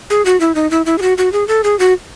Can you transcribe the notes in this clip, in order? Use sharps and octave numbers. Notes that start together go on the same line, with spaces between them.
G#4
F#4
E4
D#4
E4
E4
G#4
F#4
F#4
G#4
A4
G#4
F#4